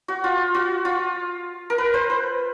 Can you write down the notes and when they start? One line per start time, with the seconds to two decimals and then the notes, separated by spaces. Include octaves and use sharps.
0.08 F#4
0.24 F4
0.55 F#4
0.85 F4
1.70 A#4
1.78 B4
1.94 C5
2.10 B4